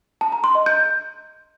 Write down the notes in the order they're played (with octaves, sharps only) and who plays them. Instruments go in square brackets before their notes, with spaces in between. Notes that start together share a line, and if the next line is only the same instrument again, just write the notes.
[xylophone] A5
A#5
C6
D#5
G6